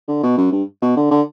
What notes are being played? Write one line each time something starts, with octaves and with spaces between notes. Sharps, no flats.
D3
B2
F#2
G2
B2
D3
D3